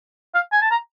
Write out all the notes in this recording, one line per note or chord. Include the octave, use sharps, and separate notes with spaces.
F5
G#5
A5
A#5